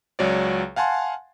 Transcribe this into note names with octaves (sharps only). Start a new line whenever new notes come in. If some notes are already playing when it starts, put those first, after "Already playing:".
C#2 F#3 C#5 D5
F5 F#5 G#5 A5 C6